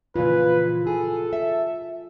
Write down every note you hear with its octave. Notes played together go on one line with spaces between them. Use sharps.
A#2 C#3 E3 F4 B4
G#4 A4
E5